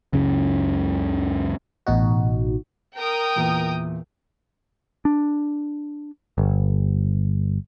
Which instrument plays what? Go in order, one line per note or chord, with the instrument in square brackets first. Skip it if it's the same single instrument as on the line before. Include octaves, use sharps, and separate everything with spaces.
[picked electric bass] C#2 F#2 C#3
[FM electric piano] A1 B2 D#4 F#4
[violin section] A#4 G5 D#6
[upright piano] E2 A#2 E3
[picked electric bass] D4
G1